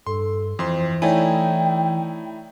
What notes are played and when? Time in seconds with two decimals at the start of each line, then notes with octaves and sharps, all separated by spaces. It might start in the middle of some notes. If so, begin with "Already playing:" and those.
0.07 G2 A4 C6
0.59 F2 E3 C5 C6
1.02 A3 D#4 E4 C#5 D5 G5 G#5